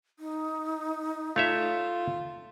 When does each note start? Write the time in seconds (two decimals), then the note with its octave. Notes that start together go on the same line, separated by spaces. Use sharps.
0.19 D#4
1.36 A3 F4 C#5 E5